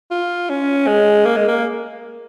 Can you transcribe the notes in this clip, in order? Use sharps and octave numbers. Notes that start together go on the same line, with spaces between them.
F4
C#4
G#3
A#3
G#3
A#3